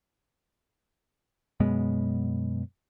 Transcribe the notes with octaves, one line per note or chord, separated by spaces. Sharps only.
F#2 B2 G#3 B3